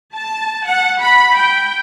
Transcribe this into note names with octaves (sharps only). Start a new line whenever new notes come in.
A5
F#5
B5
G5